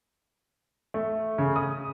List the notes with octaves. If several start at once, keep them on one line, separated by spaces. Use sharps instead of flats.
A3
C#3
D#6